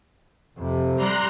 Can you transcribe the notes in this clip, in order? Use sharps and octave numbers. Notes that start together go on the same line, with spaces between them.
F2 C3
G3 A#5 C6 F#6